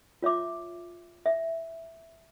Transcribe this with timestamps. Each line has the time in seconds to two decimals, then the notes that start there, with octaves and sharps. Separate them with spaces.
0.22 F4 C#5 E5 D6
1.26 E5